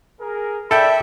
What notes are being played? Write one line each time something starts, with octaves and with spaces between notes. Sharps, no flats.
G#4 A#4
A4 D5 E5 G5 B5